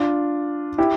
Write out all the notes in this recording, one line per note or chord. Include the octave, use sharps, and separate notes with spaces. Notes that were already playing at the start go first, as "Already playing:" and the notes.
Already playing: D4 F4
E4 G4